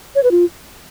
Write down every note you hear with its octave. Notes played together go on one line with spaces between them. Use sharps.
C#5
B4
F4